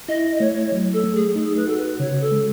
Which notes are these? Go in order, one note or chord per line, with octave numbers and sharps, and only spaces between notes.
E4 D#5
D#5
A3 C#5
F#3
A4
A3
G#4
D#4 G#4
B4
F#4 A4
B4
C#3 C#5
A4
G#3